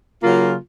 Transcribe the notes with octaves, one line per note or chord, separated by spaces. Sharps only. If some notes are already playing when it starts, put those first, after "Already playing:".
C#3 F#3 A#3 F4